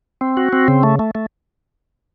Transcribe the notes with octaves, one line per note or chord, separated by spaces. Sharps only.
C4
F#4
C4
C#3
A3
A3
A3